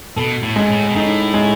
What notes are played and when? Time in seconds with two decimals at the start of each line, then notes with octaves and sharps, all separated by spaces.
0.16 B2 A4
0.43 A2
0.56 G#2 G#3
0.68 A2
0.88 B2
0.95 A2 D#4
1.34 G#3